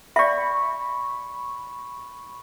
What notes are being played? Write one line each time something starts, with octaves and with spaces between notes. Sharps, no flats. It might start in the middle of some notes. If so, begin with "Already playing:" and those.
D5 E5 B5 C#6